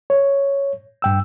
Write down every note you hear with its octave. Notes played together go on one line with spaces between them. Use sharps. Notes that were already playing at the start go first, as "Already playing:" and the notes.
C#5
G2 G5 E6